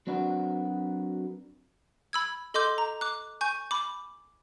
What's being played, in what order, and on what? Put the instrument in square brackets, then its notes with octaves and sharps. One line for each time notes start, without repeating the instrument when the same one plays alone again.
[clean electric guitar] F#3 C4 D4 F#4 A#4 B4
[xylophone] B5 E6 G#6
A4 D#5 C6 D6 G6
A#5
D6 F#6
G#5 C#6 G6
B5 D6